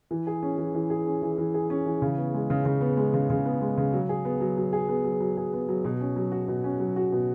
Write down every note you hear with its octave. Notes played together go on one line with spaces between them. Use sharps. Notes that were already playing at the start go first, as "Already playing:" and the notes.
E3
G#4
C#4
E3
E3
G#4
C#4
E3
E3
G#4
C#4
E3
C#3
B3
G#3
C#3
C#3
B3
G#3
C#3
C#3
B3
G#3
C#3
F#3
G#4
B3
F#3
F#3
G#4
B3
F#3
F#3
G#4
B3
F#3
B2
C#4
F#3
F#4
B2
C#4
F#3
F#4
B2